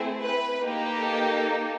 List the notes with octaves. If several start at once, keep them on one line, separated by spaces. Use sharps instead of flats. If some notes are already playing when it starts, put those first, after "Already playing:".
Already playing: A3 C4 E4 G#4
B4
A#3 D#4 G4
A4
A4